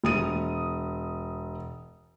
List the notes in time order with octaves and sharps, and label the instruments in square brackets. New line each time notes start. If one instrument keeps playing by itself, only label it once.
[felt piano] E1 D#6 D#7